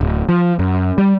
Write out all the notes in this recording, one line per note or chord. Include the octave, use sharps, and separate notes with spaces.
D1
F3
F#2
G3